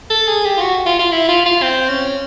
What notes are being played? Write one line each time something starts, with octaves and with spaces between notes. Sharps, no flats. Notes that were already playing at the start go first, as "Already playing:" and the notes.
A4
G#4
G4
F4
F#4
F4
F4
E4
F4
F4
C4
C#4